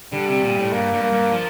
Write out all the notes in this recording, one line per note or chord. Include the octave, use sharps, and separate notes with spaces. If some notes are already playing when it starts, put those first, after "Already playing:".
D3 G3
C3
A#2
A2
G2 A#3
G2
A#3
G2
F3